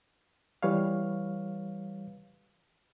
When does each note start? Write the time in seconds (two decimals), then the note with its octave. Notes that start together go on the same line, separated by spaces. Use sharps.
0.63 E3 G3 B4 C#5 F5